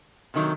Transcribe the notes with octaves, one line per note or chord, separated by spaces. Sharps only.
C3 D#3 F#3 A3